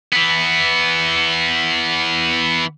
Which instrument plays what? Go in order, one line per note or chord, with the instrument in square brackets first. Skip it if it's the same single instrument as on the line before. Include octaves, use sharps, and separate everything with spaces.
[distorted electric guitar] E3 B3